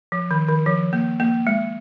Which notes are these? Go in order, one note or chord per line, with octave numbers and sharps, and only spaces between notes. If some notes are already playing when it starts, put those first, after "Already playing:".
F3
D#3
D#3
F3
A#3
A#3
G#3